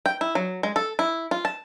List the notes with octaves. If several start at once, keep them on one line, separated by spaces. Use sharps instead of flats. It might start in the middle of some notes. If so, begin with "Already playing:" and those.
G5
E4
F#3
G#3
A4
E4
F4
A5